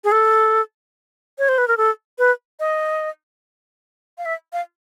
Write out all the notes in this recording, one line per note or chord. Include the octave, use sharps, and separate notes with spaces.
G#4
A4
C#5
C5
B4
A#4
A4
B4
D#5
F5
E5
F5